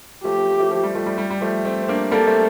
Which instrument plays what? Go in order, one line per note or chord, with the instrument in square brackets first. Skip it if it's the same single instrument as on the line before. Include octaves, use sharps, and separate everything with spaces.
[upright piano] F3 A3 [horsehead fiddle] G4
[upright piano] F3
F3 A3
F3
G3
F3 A3
G3
G3
G3
F3 A3
A3 C4
C4
A#3 D4
[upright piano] G3 A#3 [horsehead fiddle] A4
[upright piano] A3 C4